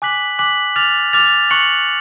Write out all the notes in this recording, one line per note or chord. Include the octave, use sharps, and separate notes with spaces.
G#5 D6 F#6 B6 F#7
G#5 D6 F#6 B6 F#7
D6 F6 A6 F7
D6 F6 A6 F7
C#6 F#6 C#7 F#7